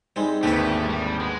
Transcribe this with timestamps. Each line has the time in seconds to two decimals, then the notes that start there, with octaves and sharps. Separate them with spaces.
0.16 G#2 G3 G#3 C4
0.43 G#1 D#2 D3 A3 G4 B4
0.89 G3
1.20 G#3 B3